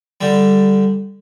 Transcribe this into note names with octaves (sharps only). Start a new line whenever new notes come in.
D3 G3